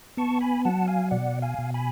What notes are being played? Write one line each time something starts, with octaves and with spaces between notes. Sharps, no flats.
B3 A5 C#6
G#5 B5
F#3 F#5 A5
F5 G#5
B2 D5 F#5
F5 G#5
B2
G#5 B5